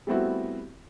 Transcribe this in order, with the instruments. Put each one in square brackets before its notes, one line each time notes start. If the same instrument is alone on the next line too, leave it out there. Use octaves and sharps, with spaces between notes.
[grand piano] G3 A3 B3 C4 E4 F#4